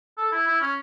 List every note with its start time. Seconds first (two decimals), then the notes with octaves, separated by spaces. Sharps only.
0.18 A4
0.32 E4
0.47 E4
0.61 C#4